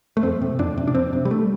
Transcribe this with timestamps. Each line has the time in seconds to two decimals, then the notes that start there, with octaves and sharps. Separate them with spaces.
0.17 A3
0.23 F2 C4
0.42 C3
0.59 F2 D4
0.77 C3
0.88 D4
0.95 F2 C4
1.13 C3
1.25 G3
1.31 A3